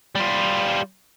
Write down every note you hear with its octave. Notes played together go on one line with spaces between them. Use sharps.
G3 F4